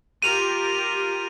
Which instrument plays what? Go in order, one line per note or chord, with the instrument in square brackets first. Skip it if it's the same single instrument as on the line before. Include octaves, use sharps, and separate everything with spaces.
[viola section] F4 G4 A#4 [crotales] D#7 F7